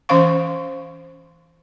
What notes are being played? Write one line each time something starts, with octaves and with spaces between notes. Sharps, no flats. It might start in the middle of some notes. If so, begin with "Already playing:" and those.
E3 C#4 C5 F5 C#6